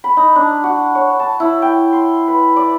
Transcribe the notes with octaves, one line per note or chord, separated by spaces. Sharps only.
B5
D#4
D4
F#4
C#5
A5
E4
G5
C6
B4
D5